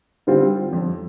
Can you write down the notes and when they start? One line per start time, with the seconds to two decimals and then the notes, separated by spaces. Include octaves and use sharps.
0.27 D3 G3 C4 F4
0.73 F2